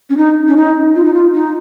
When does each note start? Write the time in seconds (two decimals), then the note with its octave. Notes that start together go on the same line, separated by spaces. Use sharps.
0.10 C#4
0.17 D#4
0.48 C#4
0.56 D#4
0.95 F4
1.04 D#4
1.14 F4
1.34 D#4